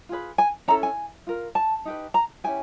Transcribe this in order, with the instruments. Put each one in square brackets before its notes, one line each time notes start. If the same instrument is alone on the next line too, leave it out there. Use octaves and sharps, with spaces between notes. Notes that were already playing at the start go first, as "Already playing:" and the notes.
[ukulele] F4 G#4 B4
G#5
C#4 E4 A4 A#5
G#5
F4 A#4
A5
D#4 G4 B4
A#5
C#4 E4 G4 G#5